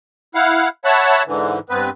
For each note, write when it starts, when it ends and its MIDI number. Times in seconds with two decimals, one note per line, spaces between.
0.35 0.68 64
0.35 0.68 77
0.35 0.68 78
0.85 1.23 73
0.85 1.23 76
0.85 1.23 78
0.85 1.23 81
0.85 1.23 83
1.27 1.59 44
1.27 1.59 50
1.27 1.59 52
1.70 1.90 43
1.70 1.90 59
1.70 1.90 60
1.70 1.90 71